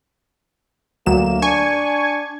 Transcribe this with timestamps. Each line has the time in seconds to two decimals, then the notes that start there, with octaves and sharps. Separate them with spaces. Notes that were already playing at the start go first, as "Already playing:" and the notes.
1.06 D2 F#3 A#3 E7
1.42 D4 G#5 C#6 G#6